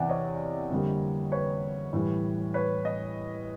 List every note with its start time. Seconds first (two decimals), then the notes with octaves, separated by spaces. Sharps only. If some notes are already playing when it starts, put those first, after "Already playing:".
Already playing: E2 C3 E3 D5 E5 F#5 G#5
0.09 C#5 D#5
0.70 F2 D3 G3 A#3
1.32 B4 C#5
1.93 A2 E3 G3
2.54 B4 C#5
2.85 D#5